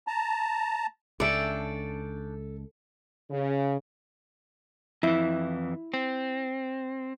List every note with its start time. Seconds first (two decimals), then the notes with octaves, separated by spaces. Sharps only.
0.07 A5 A#5
1.20 C#2 C#4 D4 A4 D5 E5 G5
3.30 C#3
5.03 F2 E3 E4
5.94 C4